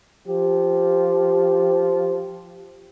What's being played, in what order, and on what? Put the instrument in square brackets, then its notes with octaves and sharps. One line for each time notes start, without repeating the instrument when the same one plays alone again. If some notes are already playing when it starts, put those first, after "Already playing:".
[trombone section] F3 G4